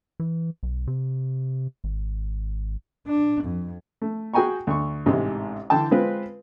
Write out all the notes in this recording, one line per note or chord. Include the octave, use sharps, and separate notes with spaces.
E3
B1
C3
G#1
D4
F2
A3
F#4 G#4 G5 G#5 A#5 C#6
D2 C#6
A1 G#2 C3 G#3
D3 E3 G5 A5
G#3 C4 F4 B4